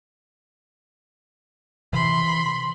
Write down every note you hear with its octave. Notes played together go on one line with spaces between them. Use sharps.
C3 E3 B5 C6